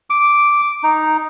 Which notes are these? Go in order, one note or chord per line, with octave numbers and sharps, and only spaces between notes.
D6
D#4